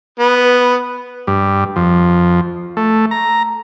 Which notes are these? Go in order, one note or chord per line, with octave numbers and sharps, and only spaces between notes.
B3
G2
F2
A3
A#5